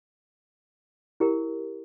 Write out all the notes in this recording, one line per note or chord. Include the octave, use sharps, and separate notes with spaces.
E4 G4 A#4